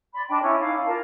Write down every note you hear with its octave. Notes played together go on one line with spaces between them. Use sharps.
D5 B5 C6
D4 D#5 G5 B5
C#4 E4
D#4 F5
D6
F4 A#4 A5